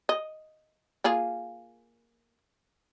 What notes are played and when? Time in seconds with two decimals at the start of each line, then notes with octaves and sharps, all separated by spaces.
0.09 D#5
1.04 A#3 F4 G#4